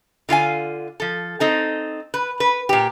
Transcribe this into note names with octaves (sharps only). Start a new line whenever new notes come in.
D3 F4 F5 G#5
F3 A4
C4 D#4 A4
B4
B4
A#2 G4